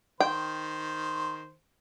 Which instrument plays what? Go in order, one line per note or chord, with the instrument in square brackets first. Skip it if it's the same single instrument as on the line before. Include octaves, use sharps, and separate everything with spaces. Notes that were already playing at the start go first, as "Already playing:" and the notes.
[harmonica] D#3 C5 [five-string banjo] G5